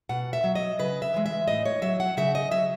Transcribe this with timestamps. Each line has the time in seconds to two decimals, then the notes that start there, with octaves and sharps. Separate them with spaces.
0.09 B2 F#5
0.33 E5
0.44 F#3
0.55 D#5
0.79 C#3 B4
1.02 E5
1.14 E3 G#3
1.26 E5
1.48 A2 D#5
1.65 C#5
1.82 F#3 E5
2.00 F#5
2.17 C#3 E5
2.35 D#5
2.51 F#3 E5